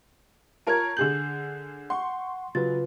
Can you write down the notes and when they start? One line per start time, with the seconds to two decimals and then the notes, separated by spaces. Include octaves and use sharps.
0.67 F4 A#4 C#5 A5 A#5 G#6
0.97 D3 G#4 G6 F#7
1.90 F#5 C6 C#6
2.55 C#3 F#3 F4 B4 A6